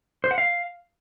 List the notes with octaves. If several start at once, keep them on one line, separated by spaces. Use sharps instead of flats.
C5
F#5
F5